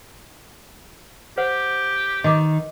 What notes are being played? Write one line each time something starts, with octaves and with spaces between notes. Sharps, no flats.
G4 C5 F#5
D#3 D#5 D6